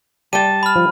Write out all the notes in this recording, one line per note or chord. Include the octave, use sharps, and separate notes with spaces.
G3 G5 A5 D#7
B5 F6
F3